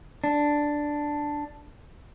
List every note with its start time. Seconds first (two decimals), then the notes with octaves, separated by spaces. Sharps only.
0.24 D4